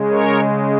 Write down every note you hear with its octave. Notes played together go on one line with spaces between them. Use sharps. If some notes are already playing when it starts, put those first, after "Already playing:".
Already playing: C#3 G#3
A#4 C#5